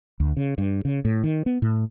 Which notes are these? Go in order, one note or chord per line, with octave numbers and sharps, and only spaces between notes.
D2
C#3
G2
C#3
A2
D#3
B3
A2